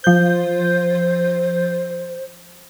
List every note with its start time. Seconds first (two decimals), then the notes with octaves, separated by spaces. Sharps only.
0.04 F3 C5 G6